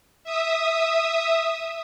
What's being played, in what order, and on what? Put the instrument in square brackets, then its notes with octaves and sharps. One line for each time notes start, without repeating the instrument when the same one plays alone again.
[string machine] E5 D#6